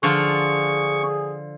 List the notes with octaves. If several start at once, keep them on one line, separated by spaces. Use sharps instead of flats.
D3 F3 F4 G#4 C#6